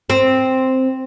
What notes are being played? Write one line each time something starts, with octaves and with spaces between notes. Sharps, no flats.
C4